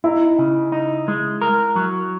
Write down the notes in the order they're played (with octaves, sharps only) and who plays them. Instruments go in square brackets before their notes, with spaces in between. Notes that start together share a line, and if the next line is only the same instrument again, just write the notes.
[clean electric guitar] D#4 [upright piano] E4
[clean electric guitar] C#3
D#4
G#3
A#4
F#3